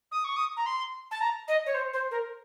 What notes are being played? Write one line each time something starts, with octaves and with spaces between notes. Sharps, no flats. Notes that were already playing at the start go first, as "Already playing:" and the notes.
D#6
C#6
D#6
A#5
C6
A5
A#5
D#5
C#5
C5
C5
A#4